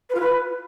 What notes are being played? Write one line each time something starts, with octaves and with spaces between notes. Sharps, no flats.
B4
F4
B4